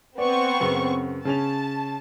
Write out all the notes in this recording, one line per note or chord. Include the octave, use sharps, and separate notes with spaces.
B3 C4 D5 C#6
F#2 C#3
C#3 C#4 A5 F7